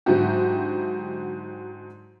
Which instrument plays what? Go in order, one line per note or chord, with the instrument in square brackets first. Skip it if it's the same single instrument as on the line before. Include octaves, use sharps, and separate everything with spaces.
[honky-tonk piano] G#2 D3 F#3 E4 F#4 G4